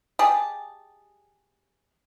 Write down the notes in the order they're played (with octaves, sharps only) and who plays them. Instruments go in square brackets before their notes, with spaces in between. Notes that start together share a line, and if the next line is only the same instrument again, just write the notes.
[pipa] G4 G#4 D#5 A5